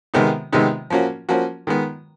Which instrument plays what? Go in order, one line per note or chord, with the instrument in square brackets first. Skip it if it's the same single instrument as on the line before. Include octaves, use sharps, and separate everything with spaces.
[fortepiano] C3 D#3 G#3 B3 D#4
C3 D#3 G#3 B3 D#4
F3 A#3 C#4 F#4
F3 A#3 C#4 F#4
D#3 G#3 B3